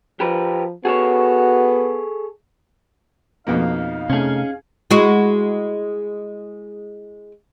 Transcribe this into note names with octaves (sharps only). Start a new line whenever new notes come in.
F3 G4 A#4 B4
B3 F#4 G#4 A4 C#5
F2 B2 A#3 D#4 F5
C3 A3 C#4 G#4
G#3 E4 F#4